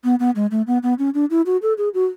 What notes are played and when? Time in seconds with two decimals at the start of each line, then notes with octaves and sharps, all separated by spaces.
0.04 B3
0.20 B3
0.36 G#3
0.51 A3
0.67 B3
0.83 B3
0.99 C#4
1.14 D4
1.30 E4
1.46 F#4
1.62 A4
1.78 G#4
1.94 F#4